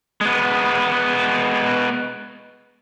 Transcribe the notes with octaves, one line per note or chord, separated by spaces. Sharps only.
G#3 B3